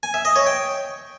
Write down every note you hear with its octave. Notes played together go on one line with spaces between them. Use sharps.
G#5
E5
D#5
C#5
G5